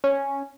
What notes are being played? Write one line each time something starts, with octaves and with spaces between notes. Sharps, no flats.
C#4